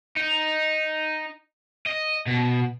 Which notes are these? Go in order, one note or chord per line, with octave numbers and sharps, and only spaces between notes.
D#4
D#5
B2